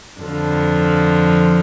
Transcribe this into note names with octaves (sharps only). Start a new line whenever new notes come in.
F2 D3 F3